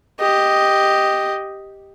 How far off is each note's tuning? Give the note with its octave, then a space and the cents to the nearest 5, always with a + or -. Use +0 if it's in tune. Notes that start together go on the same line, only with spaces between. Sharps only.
G4 +0 D#5 +0